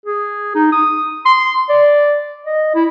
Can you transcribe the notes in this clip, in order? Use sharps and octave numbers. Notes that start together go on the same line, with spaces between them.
G#4
D#4
D#6
C6
D5
D#5
E4